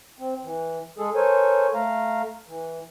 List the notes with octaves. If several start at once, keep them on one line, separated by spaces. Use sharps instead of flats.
C4
E3
G#3 G#4 A4
A4 A#4 C5 C#5 G#5
A3 F5 A#5
E3